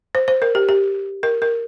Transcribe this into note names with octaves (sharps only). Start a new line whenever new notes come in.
C5
C5
A#4
G4
G4
A#4
A#4